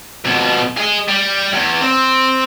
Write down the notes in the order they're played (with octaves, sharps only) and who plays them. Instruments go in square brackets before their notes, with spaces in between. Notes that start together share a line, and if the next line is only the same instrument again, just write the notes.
[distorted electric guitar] F2 B2
G#4 D#5
G3
E2
C4